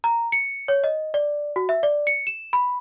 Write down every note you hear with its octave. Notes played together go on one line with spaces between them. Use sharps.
A#5
C#7
C#5
D#5
D5
F#4
E5
D5
C#7
E7
B5